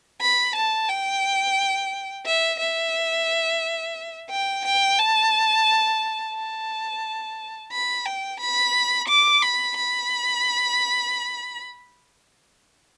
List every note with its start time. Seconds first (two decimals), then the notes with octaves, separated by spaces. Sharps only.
0.21 B5
0.56 A5
0.89 G5
2.26 E5
2.60 E5
4.30 G5
4.65 G5
4.99 A5
6.35 A5
7.72 B5
8.06 G5
8.40 B5
9.08 D6
9.42 B5
9.77 B5